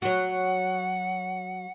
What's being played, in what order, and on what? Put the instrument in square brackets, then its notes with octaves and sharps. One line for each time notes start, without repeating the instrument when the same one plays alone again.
[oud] F#3 F#4 [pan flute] F#5